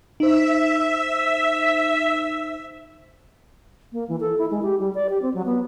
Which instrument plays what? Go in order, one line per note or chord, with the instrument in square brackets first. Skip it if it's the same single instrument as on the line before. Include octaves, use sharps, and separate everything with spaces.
[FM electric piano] D#4 C5 [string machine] E5
[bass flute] A#3
E3
A4
E4
G#3
G4
G3
D5
G4
C4
F#3
B3